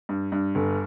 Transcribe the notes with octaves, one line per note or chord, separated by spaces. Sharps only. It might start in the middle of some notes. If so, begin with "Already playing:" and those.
G2
G2
G1